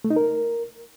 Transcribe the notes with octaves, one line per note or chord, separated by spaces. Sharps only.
A3
D#4
A#4